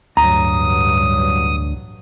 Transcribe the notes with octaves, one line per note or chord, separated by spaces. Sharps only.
A1 D2 G2 F#3 A#5 D#6